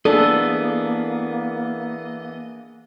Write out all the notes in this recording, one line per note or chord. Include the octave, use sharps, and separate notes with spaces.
E3 A#3 B3 D4 G#4 A4 D#5